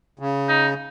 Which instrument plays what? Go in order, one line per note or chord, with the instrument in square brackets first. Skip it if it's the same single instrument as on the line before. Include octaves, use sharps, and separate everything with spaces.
[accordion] C#3
[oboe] D#4